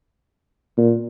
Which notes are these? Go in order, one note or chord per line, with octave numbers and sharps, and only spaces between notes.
A#2